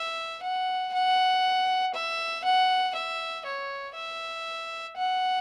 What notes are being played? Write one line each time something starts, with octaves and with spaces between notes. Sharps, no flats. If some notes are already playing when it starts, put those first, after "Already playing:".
Already playing: E5
F#5
F#5
E5
F#5
E5
C#5
E5
F#5